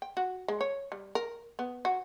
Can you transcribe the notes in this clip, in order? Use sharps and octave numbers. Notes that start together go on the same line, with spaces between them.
G5
F#4
G#3
C#5
G3
A#4
B3
F#4